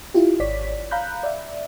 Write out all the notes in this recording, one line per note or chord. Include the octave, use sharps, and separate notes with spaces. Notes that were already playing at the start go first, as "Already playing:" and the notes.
E4 F4 G4
G#1 C#5 D5 B6
F5 A#5 B5 F#6 G6
D5 E5